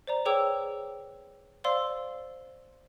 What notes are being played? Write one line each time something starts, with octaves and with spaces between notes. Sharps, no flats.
C5 D5 A#5
G#4 B4 C#5 G5 D6 E6
C5 D5 F5 C6 E6